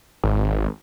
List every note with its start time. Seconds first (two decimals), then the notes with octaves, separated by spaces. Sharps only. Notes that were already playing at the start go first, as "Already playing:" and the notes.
0.24 G#1